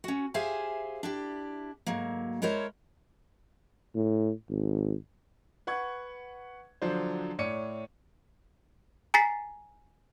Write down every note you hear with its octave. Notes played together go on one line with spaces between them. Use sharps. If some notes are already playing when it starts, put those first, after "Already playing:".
C#4 F#4
G4 G#4 C5 E5 F5 G#5
D4 E4 G4
D2 G#2 F#3 A#3
G#3 E4 A#4 C5 C#5
A2
G#1
B4 F#5 C#6 G#6
D3 F3 F#3 D4 C5
A2 C#5 D5 C#7 D#7
G#5 A#5 A6 B6 C7